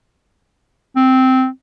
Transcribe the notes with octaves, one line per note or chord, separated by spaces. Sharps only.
C4